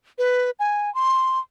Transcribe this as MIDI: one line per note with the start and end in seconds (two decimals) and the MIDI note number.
0.18 0.50 71
0.59 0.93 80
0.95 1.39 84